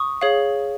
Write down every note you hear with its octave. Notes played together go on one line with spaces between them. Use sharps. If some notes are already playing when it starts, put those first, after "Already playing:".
Already playing: C#6 D#6
G#4 C#5 F5